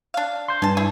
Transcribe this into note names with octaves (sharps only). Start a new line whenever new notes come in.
D4 F5
C6 G6
G2 G#4 A5
E4 G#4